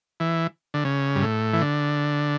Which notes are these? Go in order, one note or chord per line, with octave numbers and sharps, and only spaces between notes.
E3
D3
C#3
G2
A2
E3
D3